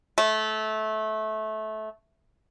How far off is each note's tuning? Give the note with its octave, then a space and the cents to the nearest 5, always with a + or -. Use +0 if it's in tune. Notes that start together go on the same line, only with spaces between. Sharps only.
A3 -20